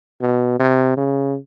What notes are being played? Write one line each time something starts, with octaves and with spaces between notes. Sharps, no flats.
B2
C3
C#3